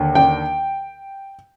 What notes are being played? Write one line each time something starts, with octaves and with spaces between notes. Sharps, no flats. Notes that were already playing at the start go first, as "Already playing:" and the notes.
Already playing: D#2 D3
G5